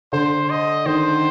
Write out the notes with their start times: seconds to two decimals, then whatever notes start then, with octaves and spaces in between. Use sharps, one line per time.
0.13 D3 C5
0.50 D#5
0.86 D#3 C5